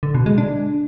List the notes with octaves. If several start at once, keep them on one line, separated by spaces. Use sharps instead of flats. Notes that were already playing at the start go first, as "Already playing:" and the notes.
D3
B2
G#3
D4